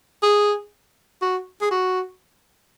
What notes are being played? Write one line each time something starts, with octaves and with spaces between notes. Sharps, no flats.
G#4
F#4
G#4
F#4